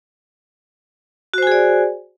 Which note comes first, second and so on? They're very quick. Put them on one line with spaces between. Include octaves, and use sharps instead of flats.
F#4 C5 G#5 G#4 D5